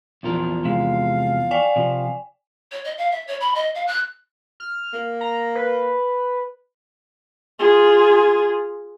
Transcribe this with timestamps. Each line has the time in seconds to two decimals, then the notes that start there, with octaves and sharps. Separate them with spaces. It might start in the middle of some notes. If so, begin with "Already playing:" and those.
0.23 E2 F3 A#4
0.65 C3 G#3 E5 F5
1.51 D5 G5 G#5
1.76 C3 F3
2.72 C#5
2.84 D#5
2.98 F5
3.11 E5
3.27 C#5
3.40 B5
3.55 D#5
3.75 F5
3.87 F#6
4.60 F6
4.93 A#3
5.21 A#5
5.55 B4
7.59 F4 G#4